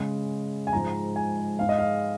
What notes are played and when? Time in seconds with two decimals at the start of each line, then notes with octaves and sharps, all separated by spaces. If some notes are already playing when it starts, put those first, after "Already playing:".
Already playing: C#3 G#3
0.67 G#5
0.73 G#2 F3 G#3 A#5
1.16 G#5
1.59 G#2 G#3 F5
1.69 D#5
1.79 F5